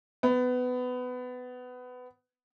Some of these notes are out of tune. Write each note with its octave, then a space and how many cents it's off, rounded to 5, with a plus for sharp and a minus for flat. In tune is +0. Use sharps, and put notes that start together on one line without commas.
B3 +20